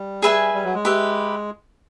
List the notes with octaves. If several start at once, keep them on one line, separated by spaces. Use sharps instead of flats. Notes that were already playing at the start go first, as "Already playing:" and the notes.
Already playing: G3
G#4 B4 E5 G#5
G3
F#3
G#3
G4 B4 E5